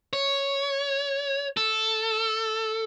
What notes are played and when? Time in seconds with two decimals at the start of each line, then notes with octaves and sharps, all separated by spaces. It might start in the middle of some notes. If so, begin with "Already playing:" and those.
0.13 C#5
1.57 A4